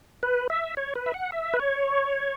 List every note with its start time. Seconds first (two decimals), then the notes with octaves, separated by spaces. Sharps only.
0.23 B4
0.50 E5
0.77 C#5
0.95 B4
1.06 E5
1.14 F#5
1.32 E5
1.54 B4
1.60 C#5